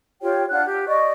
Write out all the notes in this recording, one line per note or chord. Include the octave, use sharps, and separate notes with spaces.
F4 G4 C#5 G5
D4 F4 F#5 F#6
G4
D5 D#5 C#6